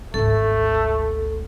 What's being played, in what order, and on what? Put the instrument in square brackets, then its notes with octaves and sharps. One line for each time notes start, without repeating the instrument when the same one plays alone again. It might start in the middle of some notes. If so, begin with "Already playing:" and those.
[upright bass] G#1 D2 [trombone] A3 [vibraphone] A4